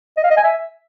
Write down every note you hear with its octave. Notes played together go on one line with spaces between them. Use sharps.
D#5
F5
D#5
G#5
E5